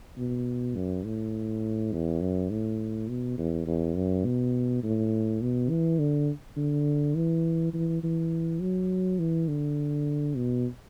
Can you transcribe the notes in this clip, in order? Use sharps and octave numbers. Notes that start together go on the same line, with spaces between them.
B2
F#2
A2
E2
F#2
A2
B2
E2
E2
F#2
B2
A2
B2
E3
D3
D3
E3
E3
E3
F#3
E3
D3
B2